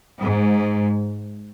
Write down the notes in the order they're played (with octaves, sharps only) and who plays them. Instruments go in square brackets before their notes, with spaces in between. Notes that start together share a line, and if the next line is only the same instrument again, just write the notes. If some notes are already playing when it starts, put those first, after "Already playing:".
[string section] G#2